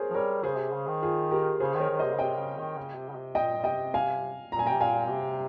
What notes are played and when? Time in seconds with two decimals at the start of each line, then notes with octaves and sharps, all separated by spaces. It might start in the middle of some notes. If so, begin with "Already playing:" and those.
Already playing: G#4 A#4 C5 C#5
0.10 F3
0.15 G3 A#4 C#5
0.43 C#3 G#4 C5
0.58 C3
0.73 C#3
0.87 D#3
1.03 F4 G#4
1.31 G4 A#4
1.60 C#3 G#4 C5
1.74 D#3
1.80 A#4 C#5
1.90 D#3
1.99 C3 C5 D#5
2.13 C#3
2.18 C3 D#5 G5
2.38 C#3
2.57 D#3
2.77 C#3
2.96 C3
3.10 C#3
3.16 C3
3.35 A#2 D#5 G5
3.58 A#2
3.64 C3 D#5 G5
3.94 F5 G#5
4.52 A#2 A#5
4.59 G#5
4.66 C3 G5 A#5
4.81 A#2 F5 G#5
5.09 C3